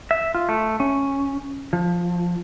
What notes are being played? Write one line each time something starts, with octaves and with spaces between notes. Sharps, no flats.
E5
F4
A3
C#4
F3